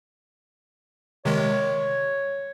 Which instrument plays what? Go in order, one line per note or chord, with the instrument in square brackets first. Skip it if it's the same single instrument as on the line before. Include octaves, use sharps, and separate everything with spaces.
[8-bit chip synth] C3 D#3 G#3 [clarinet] C#5